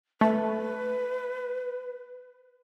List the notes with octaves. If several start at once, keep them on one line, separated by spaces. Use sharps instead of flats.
A3 B4